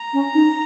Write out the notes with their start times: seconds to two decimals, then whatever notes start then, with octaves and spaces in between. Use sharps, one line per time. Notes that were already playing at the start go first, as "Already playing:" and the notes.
Already playing: A#5
0.13 C#4
0.34 D#4